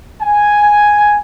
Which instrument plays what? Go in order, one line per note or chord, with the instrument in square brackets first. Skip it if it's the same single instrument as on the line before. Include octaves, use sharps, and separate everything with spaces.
[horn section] G#5